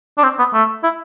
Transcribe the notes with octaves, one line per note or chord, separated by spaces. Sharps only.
D4
C4
B3
A3
E4